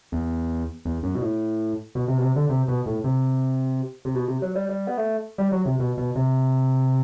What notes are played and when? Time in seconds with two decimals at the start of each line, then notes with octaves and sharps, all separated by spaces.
0.12 E2
0.85 E2
1.03 F#2
1.15 B2
1.22 A2
1.95 B2
2.08 C3
2.18 B2
2.22 C3
2.36 D3
2.49 C3
2.68 B2
2.86 A2
3.04 C3
4.05 C3
4.15 B2
4.28 C3
4.42 F#3
4.55 G3
4.69 G3
4.87 B3
4.97 A3
5.38 G3
5.52 F#3
5.66 C3
5.79 B2
5.98 B2
6.16 C3